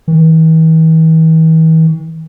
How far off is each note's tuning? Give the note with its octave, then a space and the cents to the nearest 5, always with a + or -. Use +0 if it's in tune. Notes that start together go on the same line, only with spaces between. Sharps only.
E3 -45